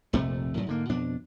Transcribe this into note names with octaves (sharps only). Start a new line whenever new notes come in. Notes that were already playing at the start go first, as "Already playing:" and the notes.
A#1 F2 C3 A3
F#2 A2
G#2 D3 A#3
F2 B2 D4